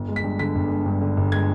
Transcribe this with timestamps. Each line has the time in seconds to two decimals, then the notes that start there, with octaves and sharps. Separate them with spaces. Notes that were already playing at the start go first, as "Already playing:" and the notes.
Already playing: G1
0.08 G#3
0.16 B6
0.24 G2
0.39 D3 B6
0.55 G1
0.70 G#3
0.86 G2
1.01 D3
1.17 G1
1.32 G#3 G#6